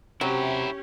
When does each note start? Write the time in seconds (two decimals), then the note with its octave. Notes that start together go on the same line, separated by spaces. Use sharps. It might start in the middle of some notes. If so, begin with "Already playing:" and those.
0.21 C3 F#3 C#4 E4 G4 G5